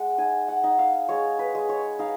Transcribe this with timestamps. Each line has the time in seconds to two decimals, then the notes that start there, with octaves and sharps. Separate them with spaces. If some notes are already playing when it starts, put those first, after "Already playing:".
Already playing: G#3 F#5
0.18 D#4 G#5
0.48 F#5
0.64 D#4
0.79 F5
1.09 G#3 C#5
1.39 B4
1.55 G#3
1.69 C#5
1.99 D#4 F5